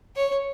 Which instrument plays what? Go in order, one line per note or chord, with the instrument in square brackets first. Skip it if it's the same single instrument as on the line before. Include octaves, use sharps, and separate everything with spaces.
[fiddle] C#5